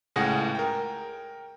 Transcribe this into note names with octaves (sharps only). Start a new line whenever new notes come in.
C#2 A2 G#4 F#5 A#6
A#4 G5